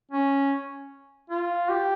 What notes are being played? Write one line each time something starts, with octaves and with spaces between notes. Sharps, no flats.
C#4
F4
G4